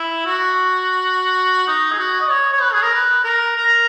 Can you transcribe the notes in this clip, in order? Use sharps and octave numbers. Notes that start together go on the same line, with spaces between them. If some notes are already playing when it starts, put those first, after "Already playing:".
Already playing: E4
F#4
D#4
G#4
F#4
D#5
C#5
C#5
B4
G#4
A#4
B4
A#4
A#4